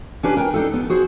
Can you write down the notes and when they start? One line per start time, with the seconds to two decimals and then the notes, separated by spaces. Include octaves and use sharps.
0.23 C#4 D4 G4 B4
0.37 A#4 G5
0.54 D4 D#4 A4
0.73 B3
0.90 F#4 G#4 C5